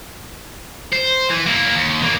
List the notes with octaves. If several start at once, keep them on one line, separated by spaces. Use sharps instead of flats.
C5
E3
A#3 E4
D#2
E3 A#3